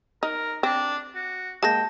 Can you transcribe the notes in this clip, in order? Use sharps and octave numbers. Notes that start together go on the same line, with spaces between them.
D#4 A#4
C4 D4
F#4
G#3 A#3 G5 A5 A#6